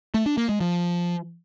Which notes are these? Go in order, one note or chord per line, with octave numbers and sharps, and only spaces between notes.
A3
D4
A#3
G#3
F3